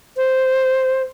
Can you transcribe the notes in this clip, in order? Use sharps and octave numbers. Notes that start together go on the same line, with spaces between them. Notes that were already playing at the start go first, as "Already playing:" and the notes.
C5